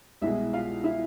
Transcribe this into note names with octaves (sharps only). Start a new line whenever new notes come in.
C2 B2 G#3 E4 E5
F4 F5
E4 E5